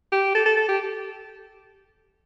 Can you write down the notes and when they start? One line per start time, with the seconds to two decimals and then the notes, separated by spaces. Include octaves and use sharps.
0.12 G4
0.35 A4
0.46 A4
0.57 A4
0.68 G4